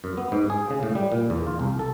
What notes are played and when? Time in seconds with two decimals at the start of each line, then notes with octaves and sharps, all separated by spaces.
0.04 F#2
0.17 B3
0.32 G#2
0.50 G#4
0.70 C#3
0.83 A2
0.95 G3
1.12 A#2
1.30 E2
1.47 F4
1.59 C2
1.79 A4